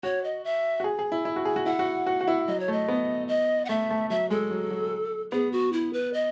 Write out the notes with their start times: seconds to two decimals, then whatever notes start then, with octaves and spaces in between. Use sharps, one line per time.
0.03 F#4 C#5
0.24 D#5
0.45 E5
0.80 F#4
0.84 G#4
0.99 G#4
1.12 E4
1.25 E4
1.36 F#4
1.45 G#4
1.56 F#4
1.66 E4 F#5
1.79 F#4
2.07 F#4
2.21 F#4
2.28 E4
2.48 F#3 D#5
2.60 C#5
2.68 A3 D#5
2.89 B3
3.28 D#5
3.65 F#5
3.69 A3 E5
3.90 A3
4.10 F#3 E5
4.30 G#3 A4
4.51 F#3
4.71 F#3
5.32 B3 G#4
5.52 F#4
5.73 E4
5.93 B4
6.14 D#5